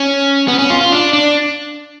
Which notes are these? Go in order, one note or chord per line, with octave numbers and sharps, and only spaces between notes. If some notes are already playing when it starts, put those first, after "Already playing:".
Already playing: C#4
B3
C#4
F4
F4
D4
D4